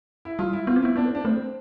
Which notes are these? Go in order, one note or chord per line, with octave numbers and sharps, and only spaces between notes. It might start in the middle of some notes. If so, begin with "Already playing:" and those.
E4
G3 F4
E4
B3 F4
C4
B3 E4
B3 D4
C4
D4
A3 C4